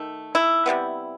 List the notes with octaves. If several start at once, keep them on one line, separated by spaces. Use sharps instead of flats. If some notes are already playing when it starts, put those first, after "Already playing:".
Already playing: D#3 A3
E4
C3 D#3 G3 B3